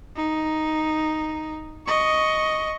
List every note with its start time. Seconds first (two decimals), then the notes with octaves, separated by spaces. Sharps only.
0.17 D#4
1.87 D#5 C#6